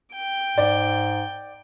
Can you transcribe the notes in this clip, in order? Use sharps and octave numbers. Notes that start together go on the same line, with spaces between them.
G5
G#2 D5